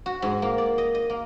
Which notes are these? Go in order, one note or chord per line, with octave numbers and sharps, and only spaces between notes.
F#4
G#2
A#3
D5
D#5
D#5
A#3